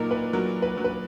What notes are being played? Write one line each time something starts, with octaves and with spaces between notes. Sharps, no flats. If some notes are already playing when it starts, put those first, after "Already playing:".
Already playing: A#2 F#3 D#4 A#4
B4
F#3 A#4
B4
F#3
B4